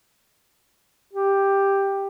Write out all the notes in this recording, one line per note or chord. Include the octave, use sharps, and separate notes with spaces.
G4